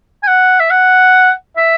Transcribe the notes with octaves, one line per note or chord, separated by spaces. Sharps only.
G#5
F#5
E5
F#5
E5